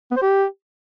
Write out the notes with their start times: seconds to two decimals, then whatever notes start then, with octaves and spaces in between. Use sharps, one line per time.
0.11 B3
0.16 C5
0.22 G4